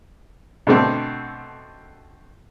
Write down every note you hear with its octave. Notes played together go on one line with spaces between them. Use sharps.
B2 D3 A3 C4